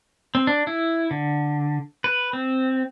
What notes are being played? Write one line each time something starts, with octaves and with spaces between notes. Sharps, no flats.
C4
D4
E4
D3
B4
C4